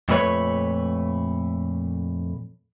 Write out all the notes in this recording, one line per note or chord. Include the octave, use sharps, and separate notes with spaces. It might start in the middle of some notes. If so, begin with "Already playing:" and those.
F2 A#2 A3 B4 C#5